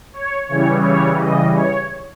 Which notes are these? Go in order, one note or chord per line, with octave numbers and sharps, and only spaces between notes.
C#5
C#3 E3 G3 C#5
C#5
D#5
C#5